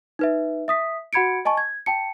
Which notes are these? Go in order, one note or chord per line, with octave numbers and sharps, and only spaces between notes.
D#4 B4 E5
E5 D#6 B6
F#4 F#5 B5 G#6 C#7 D7
D#5 G#5 A5 C#6
G#6
G5 A5 C#7